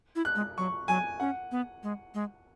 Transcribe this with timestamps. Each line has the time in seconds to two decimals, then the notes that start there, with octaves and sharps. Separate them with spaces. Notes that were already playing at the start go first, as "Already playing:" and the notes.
0.16 E4
0.25 F#6
0.36 G#3
0.58 F#3 C#6
0.88 F#3 G#5
1.20 C#4 F#5
1.51 B3
1.83 G#3
2.14 G#3